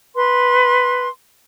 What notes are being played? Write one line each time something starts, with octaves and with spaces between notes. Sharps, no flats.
B4 C6